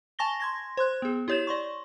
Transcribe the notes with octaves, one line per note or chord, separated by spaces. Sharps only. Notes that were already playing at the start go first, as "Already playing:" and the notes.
G#5 A5 C#6 A6 A#6 G7
C6 G#6 A#6
C5 C6 F#6
B3 G#4
E4 G4 C#5 G6 E7
D5 C6 C#6